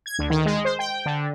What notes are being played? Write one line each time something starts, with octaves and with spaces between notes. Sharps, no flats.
G#6
D2
D#3
G#3
C5
G5
D3